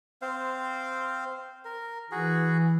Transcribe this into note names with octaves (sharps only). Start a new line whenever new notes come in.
C4 C5 F5
A#4
E3 F#4 G#4